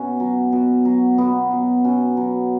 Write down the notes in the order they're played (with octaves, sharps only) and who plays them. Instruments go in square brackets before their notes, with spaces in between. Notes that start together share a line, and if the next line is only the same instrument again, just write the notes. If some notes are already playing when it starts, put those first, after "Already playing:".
Already playing: [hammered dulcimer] B2 C#4
F#3
B2
F#3
B2 B3
F#3
B2 C#4
F#3